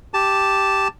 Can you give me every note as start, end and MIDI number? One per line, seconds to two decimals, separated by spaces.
0.14 0.88 67
0.14 0.88 81